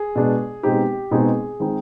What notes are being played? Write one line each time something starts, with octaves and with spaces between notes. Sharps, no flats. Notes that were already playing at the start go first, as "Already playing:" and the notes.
Already playing: G#4
B2 G#3 D4
B2 G#3 C4 D#4 G4
B2 G#3 C4 D#4 G#4
D#3 G#3 C4 D#4